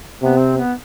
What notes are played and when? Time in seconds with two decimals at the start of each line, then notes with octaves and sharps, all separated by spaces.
0.22 C3 B3
0.39 C4
0.57 B3